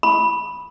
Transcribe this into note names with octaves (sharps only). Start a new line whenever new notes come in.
B5